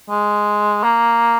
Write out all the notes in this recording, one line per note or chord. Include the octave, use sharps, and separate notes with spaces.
G#3
A#3